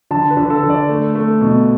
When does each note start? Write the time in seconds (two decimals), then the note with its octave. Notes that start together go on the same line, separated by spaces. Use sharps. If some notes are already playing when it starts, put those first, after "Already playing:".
0.11 D3 A5
0.30 B4
0.37 D3
0.50 A4
0.63 D3
0.70 D5
0.89 A3
1.15 A3
1.41 B2